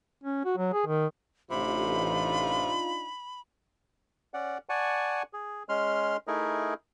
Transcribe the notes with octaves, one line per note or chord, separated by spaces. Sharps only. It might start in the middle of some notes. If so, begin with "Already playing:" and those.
C#4
F#4
F#3
G#4
D#3
A1 C3 D4 D#4 F4 B5
C#4 D5 F#5
D5 F#5 G#5 A5 C#6
G#4
G#3 C#4 C6 F6
A3 D#4 E4 G#4 A#4